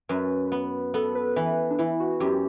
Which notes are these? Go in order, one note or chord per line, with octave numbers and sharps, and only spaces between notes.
F#2 B4
B3
B3 A4
B4
E3 B4
D4
E3 E4
F#4
F#2 G4